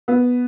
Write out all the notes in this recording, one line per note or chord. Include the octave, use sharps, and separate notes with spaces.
B3